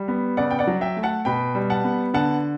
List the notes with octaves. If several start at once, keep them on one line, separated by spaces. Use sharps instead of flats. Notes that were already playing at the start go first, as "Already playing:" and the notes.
Already playing: G3
B3
C#3 D5 F#5
G5
D5 F#5
F#3
E5 G5
A3
F#5 A5
B2 G5 B5
G3
F#5 A5
B3
D3 F#5 A5